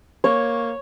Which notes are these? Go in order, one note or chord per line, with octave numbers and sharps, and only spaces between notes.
A#3 C#5